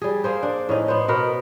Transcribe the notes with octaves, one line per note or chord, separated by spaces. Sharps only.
G3 G#4
A#3 G#4 C5
D4
A2 C#4 D#4
B3 C5
B2 B3 A#4 B4